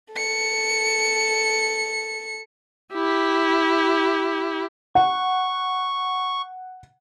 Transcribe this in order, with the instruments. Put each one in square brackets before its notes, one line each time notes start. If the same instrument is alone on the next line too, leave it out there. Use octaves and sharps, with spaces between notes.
[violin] A4 C#7
[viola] E4 G4
[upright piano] F#5 [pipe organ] C#6